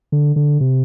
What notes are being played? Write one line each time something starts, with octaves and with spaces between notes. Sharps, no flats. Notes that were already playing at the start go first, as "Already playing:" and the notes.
D3
D3
C3